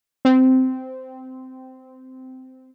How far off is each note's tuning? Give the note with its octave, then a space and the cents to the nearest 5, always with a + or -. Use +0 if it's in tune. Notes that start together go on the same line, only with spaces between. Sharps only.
C4 -15